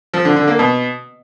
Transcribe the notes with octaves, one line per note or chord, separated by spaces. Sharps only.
F3
D3
D3
A#3
B2